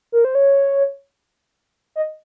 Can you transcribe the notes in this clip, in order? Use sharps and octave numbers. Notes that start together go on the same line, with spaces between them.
A#4
C5
C#5
D#5